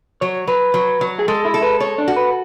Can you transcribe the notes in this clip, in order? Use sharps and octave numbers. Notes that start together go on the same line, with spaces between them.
F#3 C#5
F#3 B4
F#3
F#3
G#4
G#3 A4
E4
A4
B4
A4 C#5
D4
F#4
B4